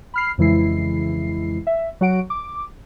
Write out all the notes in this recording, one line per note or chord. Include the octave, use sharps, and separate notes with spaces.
B5 F6 C7
F2 C#3 E3 G#3 E4 C7
E5
F#3 F#4 F#5 D7
D6